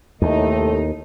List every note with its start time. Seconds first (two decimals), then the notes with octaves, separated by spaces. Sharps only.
0.22 D#2 A2 C3 A3 D#4 D#5